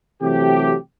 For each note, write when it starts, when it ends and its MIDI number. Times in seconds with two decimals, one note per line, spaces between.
0.22 0.75 48
0.22 0.75 52
0.22 0.75 54
0.22 0.75 57
0.22 0.75 67